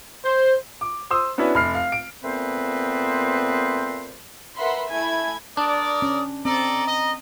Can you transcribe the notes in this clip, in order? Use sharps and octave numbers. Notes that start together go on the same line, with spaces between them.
C5
D6
C5 C6 D#6 E6
B3 C#4 D4 E4 F#4 B4
F1 B5 F6 C7
F5
D7
A#2 A3 B3 C4 B4 C5
A#4 B4 E5 F#5 B5 C6
A3 E4 G#5 B5 G#6
D4 A#4 D5 D#6
C#4
C4 A4 D5 D#5 A#5
D#5